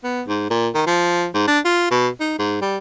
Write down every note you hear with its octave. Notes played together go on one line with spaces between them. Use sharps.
B3
G#2
A#2
D#3
F3
G#2
D4
F4
B2
D#4
G#2
G3